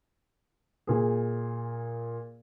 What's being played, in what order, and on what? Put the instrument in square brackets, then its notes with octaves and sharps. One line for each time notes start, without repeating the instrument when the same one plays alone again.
[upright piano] A#2 G#4